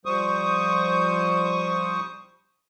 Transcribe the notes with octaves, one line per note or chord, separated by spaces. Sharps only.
F3 G3 C5 C#6 D#6